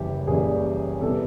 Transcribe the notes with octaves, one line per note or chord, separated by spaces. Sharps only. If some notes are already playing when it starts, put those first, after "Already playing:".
Already playing: F#1 F#2 C#3 E3 G3 G4
F#1 F#2 C#3 E3 G3 G#4
E2 C3 E3 G3 A4